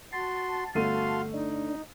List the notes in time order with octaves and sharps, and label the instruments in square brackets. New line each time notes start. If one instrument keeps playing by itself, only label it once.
[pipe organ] F#4 C6 [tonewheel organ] A5
[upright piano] G1 A3 D#7 [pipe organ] F#4 F5 C6
[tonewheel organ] D4 [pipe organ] D#4